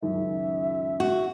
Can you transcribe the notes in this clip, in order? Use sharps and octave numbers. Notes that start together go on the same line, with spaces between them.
C#2 F#2 D#3 E5
F#4